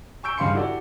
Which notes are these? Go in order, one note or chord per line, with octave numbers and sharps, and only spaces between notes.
G#5 C#6 E6 G6 D7
G2 C#3 F5 B5 C6 C#7
E4 F#4 G4 A4 D5